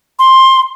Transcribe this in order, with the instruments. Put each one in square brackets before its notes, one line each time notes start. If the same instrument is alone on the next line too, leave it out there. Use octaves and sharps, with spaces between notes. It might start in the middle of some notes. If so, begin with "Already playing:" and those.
[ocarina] C6